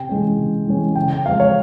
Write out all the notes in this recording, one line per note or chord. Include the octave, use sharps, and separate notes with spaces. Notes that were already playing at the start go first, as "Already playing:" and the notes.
Already playing: C3 G5
E3 G#3 C#4
C3
E3 G#3 C#4
C#3 G5
G5
F3 G#3 C4 F5
C#5